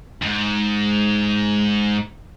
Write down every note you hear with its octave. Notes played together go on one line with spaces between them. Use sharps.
F2 G#2